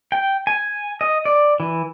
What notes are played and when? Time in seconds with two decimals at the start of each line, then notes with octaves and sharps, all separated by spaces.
0.12 G5
0.47 G#5
1.01 D#5
1.25 D5
1.60 E3